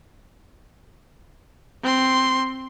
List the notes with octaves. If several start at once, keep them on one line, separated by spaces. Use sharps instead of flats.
C4 C6